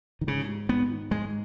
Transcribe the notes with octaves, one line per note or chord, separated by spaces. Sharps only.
D#3
G#2 C#3
G#3
G#2 B3
D#3
G#2 G#3